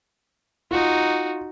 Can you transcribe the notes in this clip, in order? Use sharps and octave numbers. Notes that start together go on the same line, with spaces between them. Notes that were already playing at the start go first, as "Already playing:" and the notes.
D#4 F4 F#4